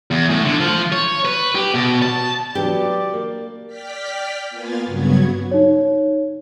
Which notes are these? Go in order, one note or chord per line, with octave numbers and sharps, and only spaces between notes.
E2
A2
D3
F3
C#5
B4
G4
B2
A5
F#3 B3 D4 G4 D5
A#3
D5 G5 F6 B6
A#3 B3 F4 G#5 A6
G2 C#3 F#3 B3 F#4 G#6
D#4 C#5